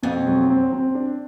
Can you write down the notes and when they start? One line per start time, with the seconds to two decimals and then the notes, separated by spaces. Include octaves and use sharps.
0.03 F2 B2
0.27 F#3
0.50 C4
0.73 C4
0.95 D4